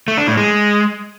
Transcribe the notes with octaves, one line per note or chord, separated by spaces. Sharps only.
A3
D4
A2
G#3